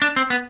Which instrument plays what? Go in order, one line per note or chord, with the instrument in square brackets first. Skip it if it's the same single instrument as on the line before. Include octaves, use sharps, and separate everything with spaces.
[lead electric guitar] D4
C4
B3